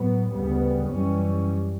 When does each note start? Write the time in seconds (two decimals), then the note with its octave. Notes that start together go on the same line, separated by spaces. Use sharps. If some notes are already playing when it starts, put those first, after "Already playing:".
Already playing: A2 F#3 B3
0.33 D2 C#3 G3 B3
0.91 F#2 E3 G3 C#4